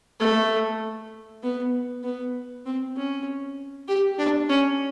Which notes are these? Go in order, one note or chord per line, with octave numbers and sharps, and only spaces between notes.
A3
B3
B3
C4
C#4
G4
D4
C#4